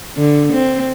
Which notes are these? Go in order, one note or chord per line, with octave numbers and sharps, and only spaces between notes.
D3
C4